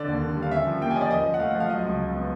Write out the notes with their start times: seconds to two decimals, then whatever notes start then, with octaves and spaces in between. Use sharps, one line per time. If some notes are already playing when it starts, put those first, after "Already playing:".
Already playing: D3 D5
0.08 D#2
0.23 D3
0.37 G3
0.42 F5
0.51 C#4 E5
0.67 F3
0.81 A#3 G5
0.91 G#5
0.96 C#4 D#5
1.01 D5
1.10 F3 D#5
1.26 F3 D#5
1.34 F#5
1.40 A3 F5
1.51 F#5
1.55 F3
1.60 F5
1.69 F#3 D#5
1.85 C#2
1.99 C#2
2.14 B3